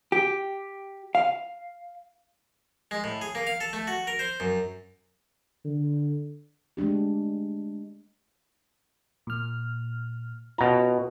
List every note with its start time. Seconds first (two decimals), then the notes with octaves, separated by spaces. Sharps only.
0.12 G4
1.15 F5
2.91 G#3
3.04 A2
3.21 G#4
3.35 A#3
3.47 F5
3.61 A4
3.73 A3
3.87 F#4
4.07 A#4
4.19 C5
4.40 F#2
5.65 D3
6.77 G#3 A3 D4 G4
9.27 A#2 F6
10.58 B2 C#4 F4 A#5